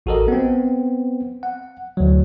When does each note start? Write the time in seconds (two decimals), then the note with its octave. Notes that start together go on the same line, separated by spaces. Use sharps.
0.06 A1 F#4 G4 A4 A#4 D#5
0.28 B3 C4
1.43 F#5
1.97 D2 F#3